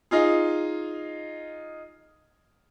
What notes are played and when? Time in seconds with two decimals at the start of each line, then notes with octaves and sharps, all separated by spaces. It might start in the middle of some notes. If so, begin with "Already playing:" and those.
0.11 D#4 F4 G#4